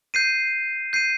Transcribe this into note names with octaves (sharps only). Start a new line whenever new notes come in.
G6 C7 D#7
G6 C7 D#7